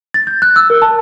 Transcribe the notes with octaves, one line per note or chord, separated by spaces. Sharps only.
A6
G6
F#6
E6
A#4
A5